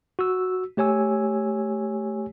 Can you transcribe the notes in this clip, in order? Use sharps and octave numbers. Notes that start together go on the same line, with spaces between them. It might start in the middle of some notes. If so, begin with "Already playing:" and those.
F#4 E6
A3 G4 C#5 G#5 E6